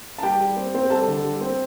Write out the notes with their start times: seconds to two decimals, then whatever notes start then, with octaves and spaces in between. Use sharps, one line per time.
0.18 A5
0.23 G3 G4 G5
0.41 G3
0.56 C4
0.74 C4
0.90 G3 A4 A5
1.08 D3
1.24 G3
1.41 C4